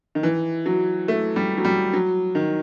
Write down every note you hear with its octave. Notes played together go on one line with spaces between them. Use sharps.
D#3
E3
F#3
A3
G3
F#3
G3
F#3
D#3